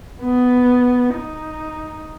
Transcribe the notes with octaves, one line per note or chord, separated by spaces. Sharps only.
B3
D#4